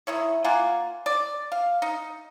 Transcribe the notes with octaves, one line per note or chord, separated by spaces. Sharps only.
D#3 E4 C#5
A#3 F4 F#5 G#5
D5
F5
D#4